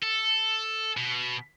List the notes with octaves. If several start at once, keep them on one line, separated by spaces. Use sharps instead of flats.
A4
B2